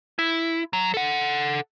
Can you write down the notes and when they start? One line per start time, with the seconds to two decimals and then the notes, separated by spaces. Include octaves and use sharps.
0.19 E4
0.73 F#3
0.94 A4 F#5